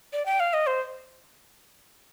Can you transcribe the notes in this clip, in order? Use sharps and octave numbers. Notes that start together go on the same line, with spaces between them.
D5
G5
F5
D#5
C5